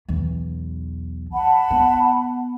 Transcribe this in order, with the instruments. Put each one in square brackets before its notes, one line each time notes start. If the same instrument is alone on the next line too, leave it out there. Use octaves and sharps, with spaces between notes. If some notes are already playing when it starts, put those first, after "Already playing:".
[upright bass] B1 E2
[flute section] F#5 A5 B5
[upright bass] B3